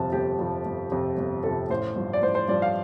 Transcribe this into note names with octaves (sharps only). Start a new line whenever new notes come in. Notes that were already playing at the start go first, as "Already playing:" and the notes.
Already playing: G1 F2 C3 F3 A5
G1 G4
F2 C3 F3
G1
F2 C3 F3
G1
F2 C3 F3 A4
A1 C5
G2 F3
D5
A1 C5
C5
G2 F3 D5
F5